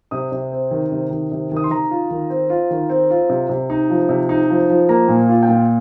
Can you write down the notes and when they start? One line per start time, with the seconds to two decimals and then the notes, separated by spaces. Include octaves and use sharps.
0.11 C3 D#6
0.32 C3
0.52 C4
0.71 D#3
0.92 C3
1.11 D#3
1.32 C3
1.51 D#3 D#6
1.64 C6
1.70 D#3 A#5
1.91 F4
2.11 D#3
2.30 C4
2.50 F4
2.71 D#3
2.90 C4
3.10 F4
3.29 C3
3.49 C3
3.70 D#4
3.90 F3
4.09 C3
4.29 D#4
4.50 F3
4.70 F3
4.89 A#3 A#5
5.08 A#2
5.29 F4
5.43 G5
5.49 A#2